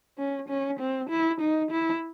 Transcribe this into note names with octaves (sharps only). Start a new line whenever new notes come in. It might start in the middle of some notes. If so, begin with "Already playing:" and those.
C#4
C#4
C4
E4
D#4
E4